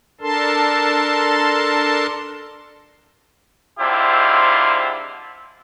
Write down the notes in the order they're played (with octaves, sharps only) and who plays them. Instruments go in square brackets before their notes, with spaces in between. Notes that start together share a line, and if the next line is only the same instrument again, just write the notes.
[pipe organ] D4 A4 A#4 A5 C6
[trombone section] G#2 D3 C4 E4 F4 G4